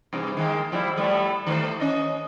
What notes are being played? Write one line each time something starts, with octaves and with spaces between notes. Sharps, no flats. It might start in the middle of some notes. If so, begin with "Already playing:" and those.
G2 C3 E3
D#3 G#3 A#3
F3 G3 E4
A2 G3 A3
D#3 A3 C5
C#4 D#5